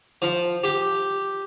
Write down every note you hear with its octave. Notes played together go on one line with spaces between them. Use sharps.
F3
G4